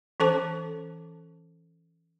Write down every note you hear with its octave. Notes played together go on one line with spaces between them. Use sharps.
E3 C#4 A4 C5 A5 D6